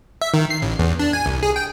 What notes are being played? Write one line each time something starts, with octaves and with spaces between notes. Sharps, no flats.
E5
D#3
C7
A1
E2
D4
G#5
C2
G#4
G5